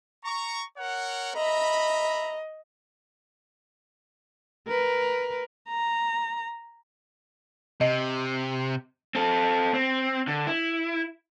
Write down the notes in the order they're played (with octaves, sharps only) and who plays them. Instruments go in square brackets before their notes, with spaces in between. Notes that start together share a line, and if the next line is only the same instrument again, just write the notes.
[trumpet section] A#5 C#6
A#4 C#5 F#5
[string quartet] D#5 [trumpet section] E5 A#5 B5
[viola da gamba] A#4 B4
[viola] A#5
[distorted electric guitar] C3 [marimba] D#5
[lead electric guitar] C4 A4
C4
D3
E4